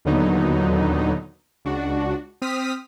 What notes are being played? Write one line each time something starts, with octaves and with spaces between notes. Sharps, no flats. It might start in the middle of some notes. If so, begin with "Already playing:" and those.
D#2 A#2 D3 F#3 B3 D#4
C#2 D4 F#4
C4 D#6 F6 B6